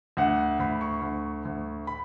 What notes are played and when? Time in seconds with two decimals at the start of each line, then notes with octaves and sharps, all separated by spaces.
0.17 D2 F#5
0.60 D2 B5
0.81 C#6
1.02 D2
1.45 D2
1.87 B5